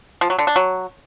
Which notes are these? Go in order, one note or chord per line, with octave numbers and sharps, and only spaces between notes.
F3
F#3
D3
D4
F#3